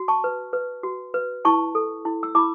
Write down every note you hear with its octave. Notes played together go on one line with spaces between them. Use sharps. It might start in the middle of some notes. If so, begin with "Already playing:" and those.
Already playing: F#4
A5 C#6
B4
B4
F#4
B4
E4 A5 C#6
A4
E4
E6
E4 B5 D6